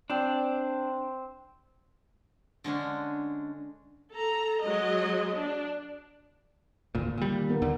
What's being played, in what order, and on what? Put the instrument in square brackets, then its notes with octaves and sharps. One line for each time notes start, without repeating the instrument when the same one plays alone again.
[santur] C4 C5 G5 [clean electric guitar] D4
[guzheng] D3 G#3 C#4 D4
[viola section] A4 A#5
F#3 G#3 D#5
D4
[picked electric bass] G#1 D2 A#2
[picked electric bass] A#2 G3 [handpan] D3 D#3 A#3
[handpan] D#3 B3 A#4
[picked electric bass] D#2 D3